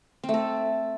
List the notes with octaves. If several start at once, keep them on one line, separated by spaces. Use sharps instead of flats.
C4
A3
A4